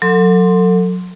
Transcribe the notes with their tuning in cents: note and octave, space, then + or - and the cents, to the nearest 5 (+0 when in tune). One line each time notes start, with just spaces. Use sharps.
F#3 -25 A4 +30 C6 +0